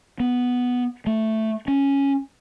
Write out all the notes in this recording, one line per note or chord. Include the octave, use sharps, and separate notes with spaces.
B3
A3
C#4